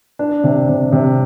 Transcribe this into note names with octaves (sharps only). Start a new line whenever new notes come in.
D4
C3
C3
C3